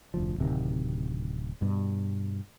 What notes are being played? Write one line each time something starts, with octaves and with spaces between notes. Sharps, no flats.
F1 D2 F3
D1 C3 D#3
G2 B2